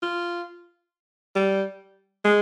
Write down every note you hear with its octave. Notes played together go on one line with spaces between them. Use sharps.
F4
G3
G#3